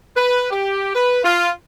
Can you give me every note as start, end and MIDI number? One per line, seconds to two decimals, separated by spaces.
0.16 0.51 71
0.51 0.94 67
0.94 1.19 71
1.24 1.50 65